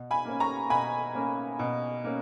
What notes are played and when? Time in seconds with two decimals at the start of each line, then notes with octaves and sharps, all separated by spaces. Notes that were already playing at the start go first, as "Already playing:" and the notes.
Already playing: B2
0.11 G#5 B5
0.25 A#3 C#4
0.40 A#5 C#6
0.70 B2 G#5 B5
1.15 A#3 C#4
1.59 B2
2.04 A#3 C#4